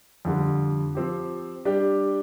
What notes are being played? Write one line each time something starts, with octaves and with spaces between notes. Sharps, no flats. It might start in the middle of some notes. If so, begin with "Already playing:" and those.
F2 D3 G3
F3 C4 G4
G3 D4 G4